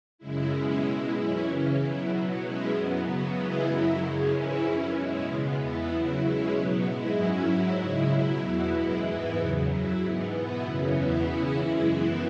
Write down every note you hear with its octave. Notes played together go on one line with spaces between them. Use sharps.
F#2 C#3 G#3 E4
B2 G#3 C#4 E4
B2 G#3 E4
F#2 E3 C#4 E4
C#3 E3 C#4
B2 F#3 E4
B2 F#3 B3
B2 G#3 C#4 E4
F#2 F#3 B3
C#3 F#3 B3
C#3 E3 G#3 B3 E4
F#2 F#3 E4
F#2 C#3 G#3 C#4
G#2 E3 C#4 E4
F#2 E3 C#4
B2 G#3 C#4 E4
C#3 G#3 B3
E2 E3 B3 E4
C#3 F#3 E4
B2 G#3 C#4 E4
B2 F#3 B3
G#2 G#3 E4
F#2 F#3 C#4 E4
G#2 F#3 E4
C#3 G#3 E4
B2 F#3 E4
E2 B2 B3 E4
F#2 E3 G#3 E4
G#2 E3 B3 E4
E2 C#3 F#3
F#2 F#3 E4
G#2 E3 B3
B2 B3 E4
F#2 C#3 E3 C#4
E2 B2 B3 E4
C#3 E3 C#4 E4
F#2 E3 G#3 E4
F#2 E3 B3 E4